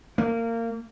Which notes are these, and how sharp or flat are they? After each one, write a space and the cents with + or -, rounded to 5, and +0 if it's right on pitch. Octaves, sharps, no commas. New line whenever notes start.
A#3 -25